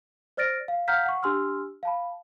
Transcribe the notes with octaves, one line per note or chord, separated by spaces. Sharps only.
C5 D5 F6 A6 A#6 D7
F5
F5 F#5 A#5 F6 G6 B6
F#5 C#6
D4 G4 G#5 C6 E6 F6
F5 A5 B5